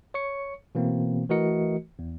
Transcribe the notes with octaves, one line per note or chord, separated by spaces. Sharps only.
C#5 C#6 C#7
B2 E3 A#3 C4
E3 A3 F#4 A#4 D#5 C#7
E2